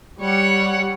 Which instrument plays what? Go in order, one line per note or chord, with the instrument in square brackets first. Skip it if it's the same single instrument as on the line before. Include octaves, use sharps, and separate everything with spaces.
[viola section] G3 [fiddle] C#5 F#5